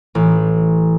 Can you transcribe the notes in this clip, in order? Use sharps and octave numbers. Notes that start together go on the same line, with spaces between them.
A1